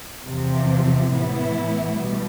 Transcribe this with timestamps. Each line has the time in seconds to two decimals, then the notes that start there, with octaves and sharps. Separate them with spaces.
0.23 E2 C3 F3 C4
1.10 A2 E3 B3 E4
1.96 B2 G3